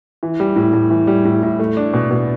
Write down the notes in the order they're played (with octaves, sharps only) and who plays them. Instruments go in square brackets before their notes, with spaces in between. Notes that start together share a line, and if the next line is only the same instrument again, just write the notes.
[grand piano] E3
G3
A2
A2
E3
G3
A2
A2
A3
D4
B2
B2